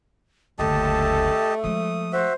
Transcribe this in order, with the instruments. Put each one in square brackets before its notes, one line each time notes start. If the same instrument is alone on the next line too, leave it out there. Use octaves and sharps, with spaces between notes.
[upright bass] F#1 D2 [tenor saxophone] A3 [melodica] G4 D#5 A5 [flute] A4
[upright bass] F3 G#3 [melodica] D#6
[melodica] F#4 E5 [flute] C5